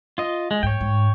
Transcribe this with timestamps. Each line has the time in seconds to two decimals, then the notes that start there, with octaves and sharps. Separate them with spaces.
0.18 F4 D#5
0.51 G#3
0.63 G#2 C#5 G5
0.80 G#2